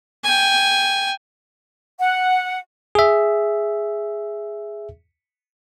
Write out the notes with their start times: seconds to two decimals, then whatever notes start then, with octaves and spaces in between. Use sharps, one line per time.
0.24 G5 G#5
1.99 F#5
2.95 G#4 E5